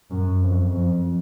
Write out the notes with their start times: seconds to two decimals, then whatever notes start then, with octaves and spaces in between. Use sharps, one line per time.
0.11 F#2
0.42 F2
0.72 F2